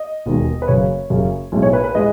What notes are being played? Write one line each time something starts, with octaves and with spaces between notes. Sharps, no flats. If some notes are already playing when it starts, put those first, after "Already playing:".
Already playing: D#5
E1 D#2 D#3 G#3
B4
F#1 F#2 C#3 C#5
F#1 F#2 C#3
B1 A2 G#3
C#5
B4
B4
A2 G#3 D#5